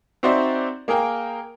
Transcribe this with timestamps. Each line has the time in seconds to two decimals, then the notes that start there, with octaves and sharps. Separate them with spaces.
0.23 C4 D#4 F#4 C5 D5 E5
0.88 A#3 G#4 A#4 G5